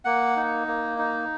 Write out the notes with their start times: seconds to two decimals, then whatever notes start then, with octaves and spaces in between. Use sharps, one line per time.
0.05 A#3 F#5
0.36 D#4
0.68 A#3
0.98 D#4